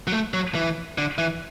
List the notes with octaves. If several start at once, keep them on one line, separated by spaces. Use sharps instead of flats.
F#3
A3
F#3
E3
D3
E3